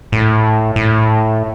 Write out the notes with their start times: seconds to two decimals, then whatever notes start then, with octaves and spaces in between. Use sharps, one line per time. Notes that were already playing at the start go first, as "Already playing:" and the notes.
0.12 A2
0.76 A2